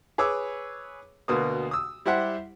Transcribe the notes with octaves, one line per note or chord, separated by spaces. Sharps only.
G#4 B4 C#5 D6 E6
D2 B2 A#3 B3 D#6
D#6 E6
G3 E4 G4 C5 E5 F#5